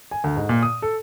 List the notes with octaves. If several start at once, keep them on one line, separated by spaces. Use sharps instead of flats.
G#5
D2
G#2
A#2
D#6
A4